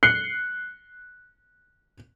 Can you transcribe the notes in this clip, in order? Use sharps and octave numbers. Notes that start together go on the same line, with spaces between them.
F#6 C7 C#7 G7